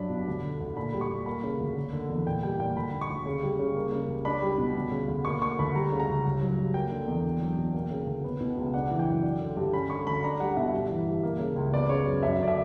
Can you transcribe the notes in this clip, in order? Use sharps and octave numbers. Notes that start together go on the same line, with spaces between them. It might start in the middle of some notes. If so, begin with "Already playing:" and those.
Already playing: G2 F#3 D4 B5
B2
D2
D3
D2
A#2 B5
G3
C#6
A#2
A#3 B5
C#3
D2
A#3
D3
E2
A#2 G5
G3 G5
A#2 G5
D2 B5
D3
C#6
D2
C#3
G3
C#3
A#3
C#3
C#2
D4 B5
G3
B2
D2
C#3
D2
A#3 C#6
D3 C#6
D2 B5
G3 A#5
C#3
A#5
C#2
G2
F#3
G2
A#3 G5
D3
E2
D4
F#3
B2
A#3
C#3
D2
B3
B2
C#2
D4 F#5
E3
G5
F#2
D4
D3
G2
C#4 B5
D3 C#6
D2 B5
D4 A#5
G3 F#5
B2 E5
G2
E3
G2
A#3
C#3
C#2
B3 D5
C#3 C#5
F#2
F#2 E5
D3 D5
E5